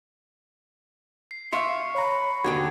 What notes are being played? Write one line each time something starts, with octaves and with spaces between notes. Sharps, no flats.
C7
E5 F5 C6 C#6 C#7
C#5 A#5 B5
D#2 D3 F#4 G5 G#6